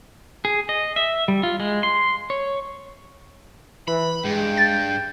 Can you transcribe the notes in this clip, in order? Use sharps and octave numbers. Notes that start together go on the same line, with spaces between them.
G#4
D#5
E5
G3
F4
G#3
C6
C#5
E3 B5
G2 G#3 G5
A6